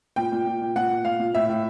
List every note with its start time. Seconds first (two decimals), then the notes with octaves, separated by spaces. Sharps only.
0.16 A#2 G5
0.32 A#2
0.46 A#2
0.61 A#2
0.76 A#2 F#5
0.90 A#2
1.05 A#2 F5
1.19 A#2
1.35 A2 E5
1.49 A2